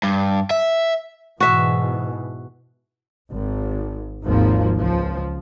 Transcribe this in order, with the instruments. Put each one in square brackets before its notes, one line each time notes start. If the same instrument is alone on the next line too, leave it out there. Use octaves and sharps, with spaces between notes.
[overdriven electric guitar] G2
E5
[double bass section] G#2 B2 E3 [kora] F#4 E5
[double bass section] G#1
G#1 D#2 G#2 F3 A#3
C#2 F3